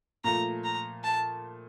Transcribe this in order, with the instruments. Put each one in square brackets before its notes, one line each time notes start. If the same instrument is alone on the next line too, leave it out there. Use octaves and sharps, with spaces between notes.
[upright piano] A#2 F3 A3 [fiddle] A#5
[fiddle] A#5
A5